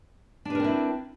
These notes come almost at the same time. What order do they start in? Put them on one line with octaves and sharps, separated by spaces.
D4 B4 A#4 C4 E4